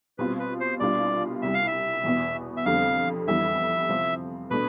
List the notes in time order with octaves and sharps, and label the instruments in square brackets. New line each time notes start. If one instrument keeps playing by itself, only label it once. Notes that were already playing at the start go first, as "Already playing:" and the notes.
[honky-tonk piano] B2 G3 C4 F4 [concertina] B4
[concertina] B4
C5
[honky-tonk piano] C2 B2 G3 D4 F4 [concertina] D5
[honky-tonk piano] C2 C3 G3 [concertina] E5
[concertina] F5
E5
[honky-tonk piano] E2 B2 B3
[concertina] E5
[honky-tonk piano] F2 D3 G3 C4 [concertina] F5
[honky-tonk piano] F2 E3 G3 B3 [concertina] E5
[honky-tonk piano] C3 F3 C4
[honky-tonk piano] B2 A3 D4 [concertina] B4